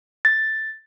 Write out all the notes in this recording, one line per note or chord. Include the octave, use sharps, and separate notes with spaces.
A6